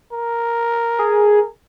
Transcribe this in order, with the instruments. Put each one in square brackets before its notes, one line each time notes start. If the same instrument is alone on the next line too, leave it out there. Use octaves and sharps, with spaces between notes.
[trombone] A#4
[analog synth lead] G#4